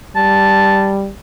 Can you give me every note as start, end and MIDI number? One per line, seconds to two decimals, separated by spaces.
0.16 1.09 55
0.16 0.92 81